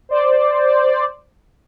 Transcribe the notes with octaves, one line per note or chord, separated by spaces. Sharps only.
C5 D5